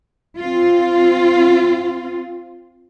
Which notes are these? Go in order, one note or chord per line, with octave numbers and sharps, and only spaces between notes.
C4 F4